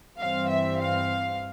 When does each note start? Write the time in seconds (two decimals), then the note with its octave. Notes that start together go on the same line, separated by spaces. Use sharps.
0.19 G2 E3 G3 C4 F5
0.49 E5
0.79 F5